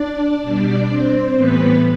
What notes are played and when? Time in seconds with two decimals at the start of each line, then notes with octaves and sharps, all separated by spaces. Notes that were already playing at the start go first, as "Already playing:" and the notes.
Already playing: D4 D5
0.42 B2 G3 D4 D5
0.89 C4 C5
1.36 A2 E3 G3 B3 B4